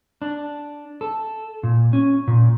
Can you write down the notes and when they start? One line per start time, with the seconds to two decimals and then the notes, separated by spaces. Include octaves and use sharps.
0.22 D4
1.01 A4
1.63 A#2
1.93 C#4
2.27 A#2